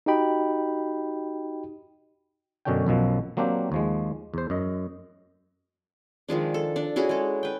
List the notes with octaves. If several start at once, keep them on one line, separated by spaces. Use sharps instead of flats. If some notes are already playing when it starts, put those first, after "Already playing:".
D#4 F#4 G4 D#5 G5 B5
F#2 B2 D3 C#4 D4 G5
B1 F#2 B2 F3
F#3 A#3 C4 D4 G4
D#2 F3 G#3
E2 C5
F#2 D#5
D#3 F3 G#3 D4
A4
D4
C#4 E4 F#4 G#4
G#3 A4
B4 G5